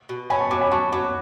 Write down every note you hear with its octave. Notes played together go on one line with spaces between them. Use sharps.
B2
C#4 G#5 B5
A5 C#6
F#3 B5 D6
G#5 B5
F#3 A5 C#6
F#3 B5 D6